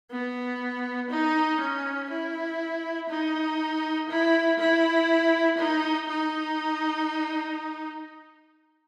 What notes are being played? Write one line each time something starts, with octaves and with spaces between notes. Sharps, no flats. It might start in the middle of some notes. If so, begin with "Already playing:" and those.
B3
D#4
C#4
E4
D#4
E4
E4
D#4
D#4